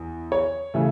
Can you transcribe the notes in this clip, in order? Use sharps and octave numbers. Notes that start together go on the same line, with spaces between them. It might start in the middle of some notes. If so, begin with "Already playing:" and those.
Already playing: E2
C#5
C#3 E3 A3